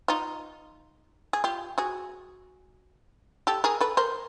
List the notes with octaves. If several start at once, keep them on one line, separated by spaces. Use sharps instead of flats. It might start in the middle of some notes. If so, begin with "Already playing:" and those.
D#4 F4
G#4
F4 G4
F#4 G#4
G4 A4
G#4 A#4
A4 B4
A#4 C5